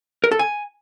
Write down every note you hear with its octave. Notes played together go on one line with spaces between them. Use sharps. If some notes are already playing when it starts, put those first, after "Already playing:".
A#4
A4
G#5